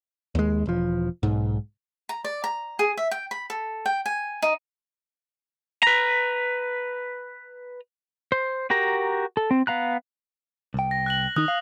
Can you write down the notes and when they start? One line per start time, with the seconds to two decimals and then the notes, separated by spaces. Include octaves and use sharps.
0.35 D#2 G#3
0.66 E1 F3
1.23 B1 G#2
2.09 A#5
2.24 D5
2.44 A#5
2.79 G#4
2.97 E5
3.11 G5
3.31 B5
3.50 A4
3.86 G5
4.06 G#5
4.42 D#4
5.83 B4 A#5
8.32 C5
8.70 F#4 G4 A#4 A#5
9.37 A4
9.51 C4
9.67 B3 F5 A#5 F#6
10.74 C2 G5
10.91 A#6
11.06 F#6 A#6 F#7
11.36 D#3 D#4 D#6 F#6
11.48 F5